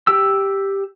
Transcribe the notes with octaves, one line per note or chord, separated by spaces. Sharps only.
G4 G5 E6